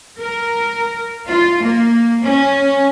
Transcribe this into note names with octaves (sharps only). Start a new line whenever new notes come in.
A#4
F4
A#3
C#4